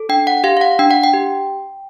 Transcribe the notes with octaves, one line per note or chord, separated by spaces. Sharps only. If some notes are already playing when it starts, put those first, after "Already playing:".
Already playing: A4
D4 G5
F#5
G4 F5
F5
F#5
D4 G5
F#5
G5
G4